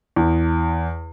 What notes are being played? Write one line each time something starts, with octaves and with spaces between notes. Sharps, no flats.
E2